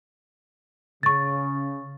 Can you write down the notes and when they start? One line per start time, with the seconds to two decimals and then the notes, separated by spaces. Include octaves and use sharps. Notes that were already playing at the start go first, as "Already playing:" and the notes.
1.03 C#3 C#6 A6